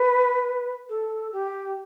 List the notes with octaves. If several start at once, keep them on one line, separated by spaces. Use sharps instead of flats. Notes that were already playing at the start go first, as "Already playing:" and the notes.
Already playing: B4
A4
G4